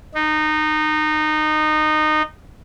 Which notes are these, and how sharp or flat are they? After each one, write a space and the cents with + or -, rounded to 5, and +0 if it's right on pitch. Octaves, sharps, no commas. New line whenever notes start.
D#4 -20